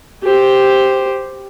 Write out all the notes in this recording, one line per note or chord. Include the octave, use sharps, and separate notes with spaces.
G4 C5